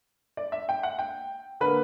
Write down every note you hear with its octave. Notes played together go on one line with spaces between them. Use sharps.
D5
E5
G5
F#5
G5
D3 A#3 B4